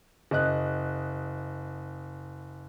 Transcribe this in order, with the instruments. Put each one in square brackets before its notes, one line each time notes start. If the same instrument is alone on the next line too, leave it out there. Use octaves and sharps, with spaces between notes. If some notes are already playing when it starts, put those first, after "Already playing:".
[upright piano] F#1 D#5 F#6